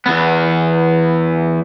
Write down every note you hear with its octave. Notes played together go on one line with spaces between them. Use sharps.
E2 B3